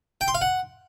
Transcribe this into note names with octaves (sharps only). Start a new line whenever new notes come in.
G5
C6
F5
F#5